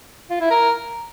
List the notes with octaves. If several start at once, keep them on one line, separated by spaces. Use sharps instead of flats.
F4
E4
A#4